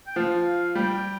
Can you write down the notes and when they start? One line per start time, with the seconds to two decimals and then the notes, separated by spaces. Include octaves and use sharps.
0.07 G5
0.16 F3 F5
0.75 G3 G5